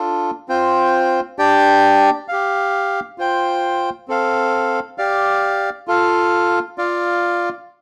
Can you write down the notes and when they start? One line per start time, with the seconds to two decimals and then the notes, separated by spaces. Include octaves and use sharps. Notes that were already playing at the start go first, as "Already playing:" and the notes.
Already playing: D4 F4 A4
0.48 C4 F4 C5 G5
1.39 D4 G4 D5 G5
2.28 G4 F5
3.18 F4 C5 G5
4.08 C4 A4 F5
4.98 G4 D5 F5
5.88 F4 A4 F5
6.78 F4 D5 F5